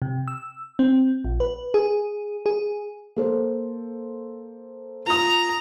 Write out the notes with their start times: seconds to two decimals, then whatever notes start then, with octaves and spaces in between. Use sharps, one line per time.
0.02 C3
0.28 E6
0.79 C4
1.25 A#1
1.40 B4
1.74 G#4
2.46 G#4
3.16 A#3 A4 C5
5.07 F4 A#5 D#6